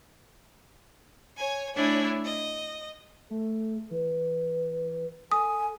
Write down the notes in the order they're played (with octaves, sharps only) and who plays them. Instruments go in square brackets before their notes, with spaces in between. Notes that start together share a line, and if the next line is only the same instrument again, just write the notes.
[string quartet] C#5 G#5
A3 D4 E4 C#5 G#5
D#5
[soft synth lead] A3 [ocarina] A4
[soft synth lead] E3 [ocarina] B4
[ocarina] A4 [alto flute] G#5 [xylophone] D#6